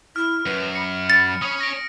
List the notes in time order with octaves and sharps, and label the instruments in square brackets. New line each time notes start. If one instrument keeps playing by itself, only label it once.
[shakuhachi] E4 [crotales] F6
[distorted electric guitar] F#2 [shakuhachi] B4
[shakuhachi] B5 [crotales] C#7
[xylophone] A6 [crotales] C#7
[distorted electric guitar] C#4 C#5 [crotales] D#6
[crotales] A#6 D7